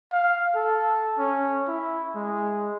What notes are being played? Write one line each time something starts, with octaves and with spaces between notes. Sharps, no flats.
F5
A4
C#4
E4
G#3